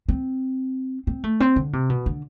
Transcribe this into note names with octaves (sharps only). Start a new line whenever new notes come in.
C4
C4
A3
C4
D3
C3
B2
D3